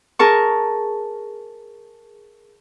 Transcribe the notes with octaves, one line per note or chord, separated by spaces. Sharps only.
G#4 A#4 A5 C#6